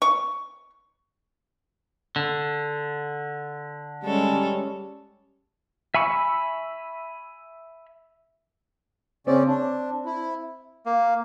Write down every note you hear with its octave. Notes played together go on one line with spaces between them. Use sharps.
C#6
D3
G3 G#3 C#4 A4 C#5
E5 G#5 B5 C#6 E6
C#3 C4 C#4 D5
D4
E4
A#3